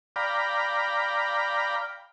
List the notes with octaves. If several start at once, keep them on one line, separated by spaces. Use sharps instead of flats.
D5 F5 G5 A#5 B5